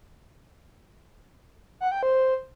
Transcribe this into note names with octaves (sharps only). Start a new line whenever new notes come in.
F#5
G5
C5